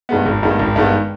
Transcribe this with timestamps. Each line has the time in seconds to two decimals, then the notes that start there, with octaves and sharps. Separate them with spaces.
0.09 G2 D#3 G#3 B3
0.26 G#1
0.43 G2 D#3 G#3 B3
0.59 G#1
0.76 G2 D#3 G#3 B3